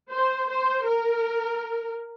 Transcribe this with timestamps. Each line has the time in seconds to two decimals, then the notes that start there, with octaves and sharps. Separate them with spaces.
0.11 C5
0.49 C5
0.87 A#4